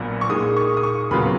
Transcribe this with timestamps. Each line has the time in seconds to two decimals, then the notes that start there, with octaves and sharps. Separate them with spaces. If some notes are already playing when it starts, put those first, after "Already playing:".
Already playing: A#1 A#2 F#3 B3
0.21 C#6
0.30 A#2 G#3 D#4 D#6
0.56 C#6
0.77 D#6
0.83 C#6
1.11 D#2 C#3 F#3 B3 F4 B5